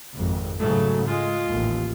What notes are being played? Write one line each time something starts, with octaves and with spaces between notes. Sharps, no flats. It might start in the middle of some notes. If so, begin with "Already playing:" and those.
G#1 F2
G#2 C#3 F#3 A3
G#3 F4
A1 D#2